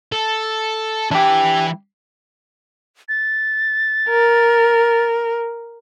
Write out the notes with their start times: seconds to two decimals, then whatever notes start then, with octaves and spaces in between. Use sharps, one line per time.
0.12 A4
1.11 E3 D4 E4 G4
3.09 A6
4.07 A#4